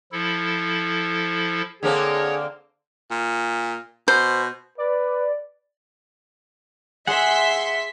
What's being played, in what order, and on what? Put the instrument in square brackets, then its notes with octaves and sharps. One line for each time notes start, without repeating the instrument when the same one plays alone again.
[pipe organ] F3 E4 A4
[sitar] D3 A#3 C4 [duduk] G#4 [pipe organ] C#5
[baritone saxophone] A#2
[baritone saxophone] B2 [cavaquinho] C5
[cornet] B4 [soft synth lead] D5
[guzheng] G#4 [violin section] E5 C6 B6 [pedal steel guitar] F#5